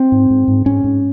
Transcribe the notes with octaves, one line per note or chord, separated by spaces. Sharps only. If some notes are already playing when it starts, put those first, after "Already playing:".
Already playing: C4
G#2
G#2
G#2
G#2 C#4
G#2